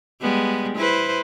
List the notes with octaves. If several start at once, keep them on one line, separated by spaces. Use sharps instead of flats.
G3 G#3 B3
E4 B4 C5